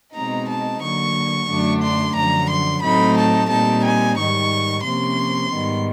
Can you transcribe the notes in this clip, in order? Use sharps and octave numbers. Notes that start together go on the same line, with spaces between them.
B2 G#3 C4 D#4 A#5
A5
D3 F#3 A#3 C#6
F#2 D3 F#3 A3 D4
C6
F#2 D3 F3 A#5
C6
A2 F#3 A3 C4 D#4 B5
A5
A#2 G3 C4 D#4 A5
G#5
G#2 D#3 G3 C#6
C3 F3 A#3 C#4 C6
G#2 D#3 G3 B3